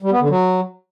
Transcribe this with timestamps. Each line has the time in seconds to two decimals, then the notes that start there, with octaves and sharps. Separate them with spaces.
0.02 G3
0.12 B3
0.21 D3
0.30 F#3